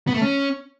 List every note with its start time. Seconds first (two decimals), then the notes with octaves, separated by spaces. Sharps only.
0.07 B3
0.14 A3
0.21 C#4